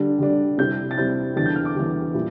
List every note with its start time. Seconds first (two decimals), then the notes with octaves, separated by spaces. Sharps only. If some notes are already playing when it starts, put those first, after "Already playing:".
Already playing: D3 G3 D4
0.19 D3 G3 D4
0.58 C3 G3 C4 E4 G6
0.91 A6
0.97 C3 G3 C4 E4 G6
1.36 E2 D3 G3 A6
1.46 G6
1.56 F6
1.65 D6
1.76 E2 D3 G3
2.14 A#2 G3 E4